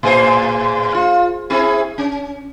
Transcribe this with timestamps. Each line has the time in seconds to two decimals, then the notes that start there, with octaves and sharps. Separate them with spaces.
0.03 A2 G#4 C5
0.94 F4
1.50 C4 E4 G#4
1.98 C#4